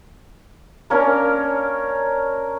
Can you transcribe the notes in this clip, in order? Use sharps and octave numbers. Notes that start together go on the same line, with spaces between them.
A#3 C#4 D4 A#4